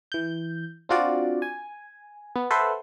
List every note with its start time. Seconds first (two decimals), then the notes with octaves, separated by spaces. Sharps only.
0.12 E3 G6
0.89 C4 D4 F4 F#4 D5
1.42 G#5
2.36 B3
2.51 A4 B4 C5 E5 F#5 C6